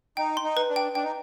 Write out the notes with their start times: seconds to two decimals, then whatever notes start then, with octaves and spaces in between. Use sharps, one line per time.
0.17 D#4 G5
0.37 C6
0.43 D#4
0.57 B4
0.69 D4
0.76 G5
0.95 D4 G5
1.04 D#4